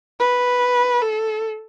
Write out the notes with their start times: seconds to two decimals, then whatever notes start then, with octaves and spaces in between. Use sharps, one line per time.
0.20 B4
1.01 A4